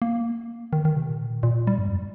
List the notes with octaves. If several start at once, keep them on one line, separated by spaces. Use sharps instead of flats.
A#3
D#3
D#3
C3
A#2
A#2
G3
G2
F2